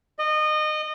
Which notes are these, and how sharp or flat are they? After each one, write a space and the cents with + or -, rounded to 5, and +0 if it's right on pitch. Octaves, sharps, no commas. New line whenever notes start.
D#5 -25